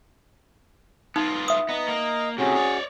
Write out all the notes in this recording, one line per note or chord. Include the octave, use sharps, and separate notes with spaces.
B3 D#4 F4
E5 D#6
B3 D#5 A#5
A#3
A2 C3 C#4 F#4 G#4
C#5 D5